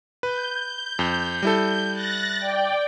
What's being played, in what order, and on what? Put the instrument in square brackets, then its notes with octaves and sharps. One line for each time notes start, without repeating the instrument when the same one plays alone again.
[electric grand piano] B4 [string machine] G6
[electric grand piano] F2
G3 E4 A4
[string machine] F#6 A6 A#6
D5 G5